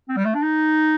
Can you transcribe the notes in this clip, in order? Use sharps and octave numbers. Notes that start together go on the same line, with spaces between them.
C4
G3
A3
D4
D#4